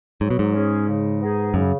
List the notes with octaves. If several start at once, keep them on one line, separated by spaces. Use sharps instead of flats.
G#2 F#3
B2
G#2
C#4 G#4
C#3
B3 D#4 G#4
F#2 C#3